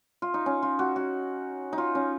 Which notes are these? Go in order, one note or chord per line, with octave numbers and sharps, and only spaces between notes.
F4
D#4
C#4
F4
F#4
F#4
D#4
F4
C#4